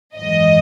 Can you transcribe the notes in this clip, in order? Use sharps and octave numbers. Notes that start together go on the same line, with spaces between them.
G#1 F#2 E3 G#3 D#5